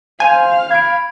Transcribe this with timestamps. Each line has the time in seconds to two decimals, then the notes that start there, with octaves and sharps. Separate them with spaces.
0.20 C5 F5 G#5
0.71 B5 G#6 D7